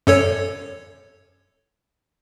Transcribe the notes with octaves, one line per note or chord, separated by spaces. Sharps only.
F#2 A4 C#5